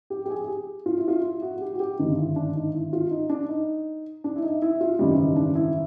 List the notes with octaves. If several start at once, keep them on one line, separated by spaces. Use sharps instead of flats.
G4
G4
G#4
G#4
G4
F4
E4
F4
E4
F#4
F#4
G4
F#4
G4
G#1 G2 D3 D#4
E4
D4
D#4
E4
F4
D#4
D4
D#4
D4
E4
D#4
E4
F4
G#1 F#2 C#3 E3 G3 D#4
D#4
D4
E4